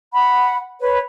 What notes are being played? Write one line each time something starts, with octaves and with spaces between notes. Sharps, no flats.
F#5 B5
B4 C#5